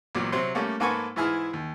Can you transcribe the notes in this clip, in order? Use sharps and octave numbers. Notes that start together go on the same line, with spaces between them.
A1 A#2 F#3
C3 F#3 C4 C6
G3 A3 A#3 C#4
G#2 A#3 A4 B4 G#5 C#6
G#2 E3 E4 G#4 F6
D#2